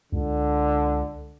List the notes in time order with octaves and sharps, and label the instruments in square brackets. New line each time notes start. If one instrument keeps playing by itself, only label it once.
[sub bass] C#2 [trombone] D3